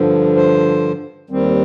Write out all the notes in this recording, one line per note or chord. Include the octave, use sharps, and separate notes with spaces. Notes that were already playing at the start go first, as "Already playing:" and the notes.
Already playing: G2 D3 F3
C5
D#2 D#3 G3 C4